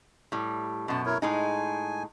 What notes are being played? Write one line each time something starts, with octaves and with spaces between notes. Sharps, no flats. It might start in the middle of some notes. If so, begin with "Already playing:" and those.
A2 G3
F#2 B2 A5
E4 A#4 C#5
A2 G#3 D#4 G#5